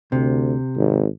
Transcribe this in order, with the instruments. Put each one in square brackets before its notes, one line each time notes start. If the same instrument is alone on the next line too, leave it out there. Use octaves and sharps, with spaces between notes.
[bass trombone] D2 [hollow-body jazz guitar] C3
[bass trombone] G#1